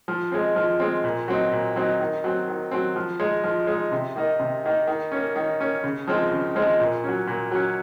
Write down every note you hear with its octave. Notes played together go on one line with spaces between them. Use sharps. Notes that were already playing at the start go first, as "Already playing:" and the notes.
F3
G#3 C4
F3
G#3 C4
A#2
F#3 C4 D#4
A#2
F#3 C4 D#4
D#3
F#3 C4
D#3
F#3 C4
F3
G#3 D#4
F3
G#3 D#4
C3
D#3 A#3 D#4
C3
D#3 A#3 D#4
D#3
A#3 C#4
D#3
A#3 C#4
C#3
F3 G#3 C4 D#4
C#3
F3 G#3 C4 D#4
A#2
F#3 C#4
A#2
F#3 C#4